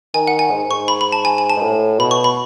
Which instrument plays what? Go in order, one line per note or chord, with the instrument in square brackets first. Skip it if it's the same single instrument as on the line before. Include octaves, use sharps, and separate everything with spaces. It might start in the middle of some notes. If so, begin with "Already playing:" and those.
[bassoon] D#3 [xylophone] G#5
[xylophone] F#5
G#5
[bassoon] G#2
[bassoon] G#2 [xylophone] C#6
[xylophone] B5
B5
A5
G#5
G#5
A5
[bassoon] G#2
A2
[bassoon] B2 [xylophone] B5
[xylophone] C#6
B5